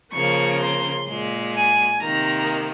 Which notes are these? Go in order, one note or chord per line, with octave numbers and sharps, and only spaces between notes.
C#3 F3 A#3 C#6
C6
A#2 G#3
G#5
C3 D#3 A#3 A#5